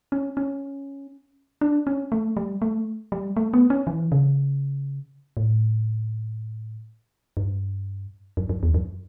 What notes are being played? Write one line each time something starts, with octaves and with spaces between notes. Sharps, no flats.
C#4
C#4
D4
C#4
A3
G3
A3
G3
A3
B3
C#4
E3
C#3
A2
G2
F#2
F#2
E2
F#2